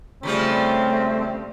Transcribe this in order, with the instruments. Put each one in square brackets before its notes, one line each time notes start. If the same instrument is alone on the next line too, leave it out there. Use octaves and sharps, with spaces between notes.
[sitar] C#3 F3 G3 [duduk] A3 [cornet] C4